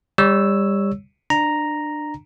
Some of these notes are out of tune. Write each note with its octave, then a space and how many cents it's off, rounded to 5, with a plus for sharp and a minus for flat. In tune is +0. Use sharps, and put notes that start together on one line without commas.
G3 +30 C#5 +0 E6 +0
D4 +25 A#5 +0